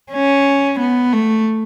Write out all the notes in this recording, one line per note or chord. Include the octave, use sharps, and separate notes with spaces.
C#4
B3
A3